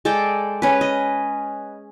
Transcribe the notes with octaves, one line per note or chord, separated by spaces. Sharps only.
G#3 A4 D5 G5
C#4 B4
D#5